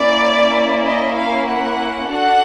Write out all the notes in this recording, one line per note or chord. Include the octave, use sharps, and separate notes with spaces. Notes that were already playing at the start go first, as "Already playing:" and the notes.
Already playing: A#3 C#4 E4 D5
D#5
F5
F#5
D4 F#4 A4 F#5